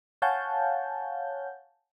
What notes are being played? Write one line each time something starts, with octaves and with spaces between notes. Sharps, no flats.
C#5 F5 F#5 G#5 A5 G6